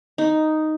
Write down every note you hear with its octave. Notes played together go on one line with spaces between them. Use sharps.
D#4